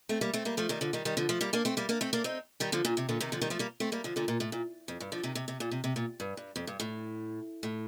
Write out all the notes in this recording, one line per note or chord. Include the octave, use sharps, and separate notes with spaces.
A3 C4
G3 A#3
A3 C4
G3 A#3
F3 A3
D#3 G3
D3 F3
D#3 G3
D#3 G3
D3 F3
F3 A3
G3 A#3
A#3 D4
A3 C4
G3 A#3
A#3 D4
A3 C4
A#3 D4
C4 D#4
D#3 G3
D3 F3
A#2 D3
C3
A#2 D3
C3 D#3
D3 F3
D#3 G3
F3 A3
G3 A#3
A3 C4
G3 A#3
D3 F3
A#2 D3
A#2
A2
A#2
F2
G2
D3 F3
C3 D#3
C3
C3
A#2
C3
C3
A#2
G2
G2
F2
G2
A2
A2